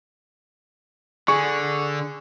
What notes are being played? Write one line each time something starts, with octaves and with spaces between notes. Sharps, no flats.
D3 G#4 C#6